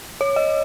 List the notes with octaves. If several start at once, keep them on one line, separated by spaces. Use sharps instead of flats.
C#5
D#5